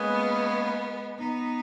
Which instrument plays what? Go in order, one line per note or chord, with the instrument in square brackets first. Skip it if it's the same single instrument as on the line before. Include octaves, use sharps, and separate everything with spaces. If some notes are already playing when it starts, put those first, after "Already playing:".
Already playing: [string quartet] G#3 B3 [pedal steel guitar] A#3 C#4 G#4 B4
[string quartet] B3 D#4